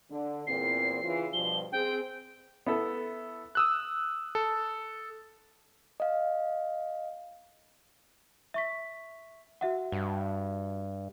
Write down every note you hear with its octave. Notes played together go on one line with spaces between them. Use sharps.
D3
E2 A#2 C4 C7
C#3 E3 F4
G2 B2 F3 G7
C4 G#4 G5
B3 E4 A4
D#6 E6 F#6
A4
D#5 F5
E5 C#6 B6
F#4 E5 F#5
G2